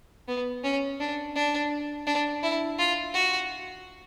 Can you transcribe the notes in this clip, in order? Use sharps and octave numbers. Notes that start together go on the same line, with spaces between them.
B3
C#4
D4
D4
D4
E4
F4
F#4